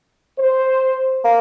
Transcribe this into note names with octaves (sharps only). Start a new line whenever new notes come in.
C5
A#3